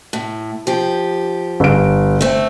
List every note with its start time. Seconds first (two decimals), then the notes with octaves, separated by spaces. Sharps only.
0.13 A2
0.67 F3 G4
1.60 G1 D7
2.21 A3 C4